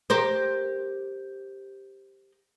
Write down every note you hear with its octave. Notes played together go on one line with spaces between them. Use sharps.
G4 A#4 C5